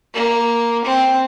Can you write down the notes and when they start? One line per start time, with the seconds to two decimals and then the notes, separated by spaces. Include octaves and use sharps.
0.14 A#3
0.84 C4